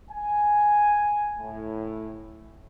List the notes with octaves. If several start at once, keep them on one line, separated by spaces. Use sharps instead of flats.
G#5
A2